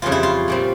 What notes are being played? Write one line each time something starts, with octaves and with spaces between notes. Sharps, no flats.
F2 C#3 E3 G3 F4
E4
F4
A#2 G3 C4